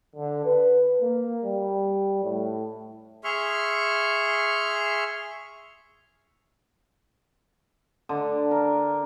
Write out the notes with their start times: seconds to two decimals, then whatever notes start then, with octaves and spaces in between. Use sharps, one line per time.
0.16 D3
0.45 B4
1.02 A#3
1.45 G3
2.24 A2
3.24 G#4 E5 C6 C#6 F6
8.09 D3
8.51 A#4